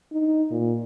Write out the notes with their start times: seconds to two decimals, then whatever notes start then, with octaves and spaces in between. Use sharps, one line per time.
0.12 D#4
0.51 A#2